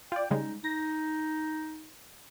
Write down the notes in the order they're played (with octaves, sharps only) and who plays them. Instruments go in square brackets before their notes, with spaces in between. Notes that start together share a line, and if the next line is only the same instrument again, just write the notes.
[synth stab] F4 D5 [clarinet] G5
[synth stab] C#3 G3 G#3 [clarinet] D#4
[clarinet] D#4 [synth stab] A#6